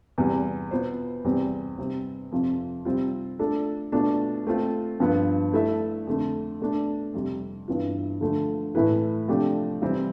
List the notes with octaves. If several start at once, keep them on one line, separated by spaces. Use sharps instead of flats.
E2 C3 G3
B2 B3 F4 C5
E2 C3 G3 C4
C3 G3 C4
F2 C3 F3
C3 G3 C4 F4
A3 D4 F4 A4
B2 A3 D4 F4
A3 C4 F4
G2 F3 B3
A3 E4 A4 E5
F2 D3 A3
B2 A3 D4
F2 C3 G3
G2 E3 B3 F4
D3 F3 A3
A2 E3 A3 E4 B4
C3 F3 A3 D4 G4
C3 E3 G3 C4 E4